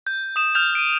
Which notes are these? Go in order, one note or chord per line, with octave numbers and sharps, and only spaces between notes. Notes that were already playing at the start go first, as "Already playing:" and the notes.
G6
D#6 E7
F6 G6 F7
D7 D#7